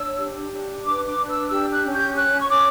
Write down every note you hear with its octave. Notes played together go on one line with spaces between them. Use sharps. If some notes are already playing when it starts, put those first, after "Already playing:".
Already playing: D4 C#5 E6
G4
D4
B4 D6
D6
D4
E6
G4 E6
F#6
C#4
G6
C#5 F#6
C#6
C#4 D6